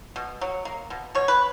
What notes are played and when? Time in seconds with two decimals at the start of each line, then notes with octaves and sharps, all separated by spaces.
0.16 B2
0.41 F#3
0.65 A#3
0.90 B2
1.15 B2 C#5
1.28 B4